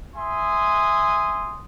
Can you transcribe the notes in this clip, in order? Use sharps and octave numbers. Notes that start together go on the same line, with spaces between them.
E5 G#5 C6 D#6